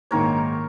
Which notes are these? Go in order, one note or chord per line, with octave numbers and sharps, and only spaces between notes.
A#1 G#2 D#3 A#3 A#4 C#5